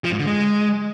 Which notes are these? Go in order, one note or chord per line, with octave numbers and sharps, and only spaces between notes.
F3
G#2
D3
G#3